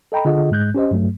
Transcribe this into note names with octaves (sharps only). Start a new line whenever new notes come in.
A4 D#5 G5 A#5 B5
D3 F4 G#4 D#5 F#5
G#2 G#3 F#6 G6
C#4 G4 C5 D#5
G2 F#3 A3